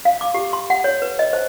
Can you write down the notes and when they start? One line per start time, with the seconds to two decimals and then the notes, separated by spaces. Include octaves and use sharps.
0.05 F5
0.21 D6
0.34 G4
0.53 C6
0.70 F#5
0.84 C#5
1.02 B4
1.19 D#5
1.33 C5